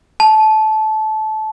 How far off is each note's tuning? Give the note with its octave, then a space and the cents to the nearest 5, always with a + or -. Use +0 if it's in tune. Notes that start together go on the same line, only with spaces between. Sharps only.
A5 -20